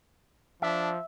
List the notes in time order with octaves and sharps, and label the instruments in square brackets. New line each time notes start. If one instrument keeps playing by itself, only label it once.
[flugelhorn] F3 [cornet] D4 [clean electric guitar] E5